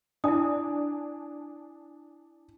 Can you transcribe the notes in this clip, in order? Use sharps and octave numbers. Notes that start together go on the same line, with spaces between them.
D4 E4 G#5 D#6